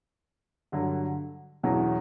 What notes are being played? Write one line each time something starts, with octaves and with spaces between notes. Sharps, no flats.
G2 D3 F#3
E2 B2 F#3 C#4